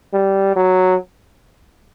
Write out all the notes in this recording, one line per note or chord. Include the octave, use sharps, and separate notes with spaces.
G3
F#3